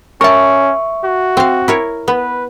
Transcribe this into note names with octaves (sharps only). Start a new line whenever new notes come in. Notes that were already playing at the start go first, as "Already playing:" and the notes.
C#4 A#4 E5 A5 C#6
F#4
C4 F5
E4 A#4 C#5
B3 B4